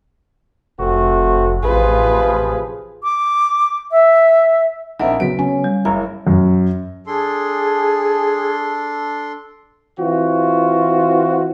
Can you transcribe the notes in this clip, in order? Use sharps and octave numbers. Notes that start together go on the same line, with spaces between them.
F1 A3 C4 F#4
A1 C3 F3 F4 G#4 B4
D6
E5
A#1 C4 D#4 E4 A#4 F#5
C#3 F#3 B3 B6 D7
C#4
G3
F#1 E4 A#4 C#5 A#5
F#2
D4 G#4 A4 C6
E3 C4 F4 F#4